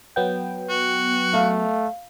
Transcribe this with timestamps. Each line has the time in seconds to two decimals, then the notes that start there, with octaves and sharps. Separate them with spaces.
0.16 F#3 B3 G5
0.70 F#4
1.34 A3 F5